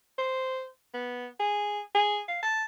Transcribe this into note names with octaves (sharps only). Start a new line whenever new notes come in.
C5
B3
G#4
G#4
F5
A5